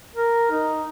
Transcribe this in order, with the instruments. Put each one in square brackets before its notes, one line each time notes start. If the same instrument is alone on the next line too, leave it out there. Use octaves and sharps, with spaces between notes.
[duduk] A#4
D#4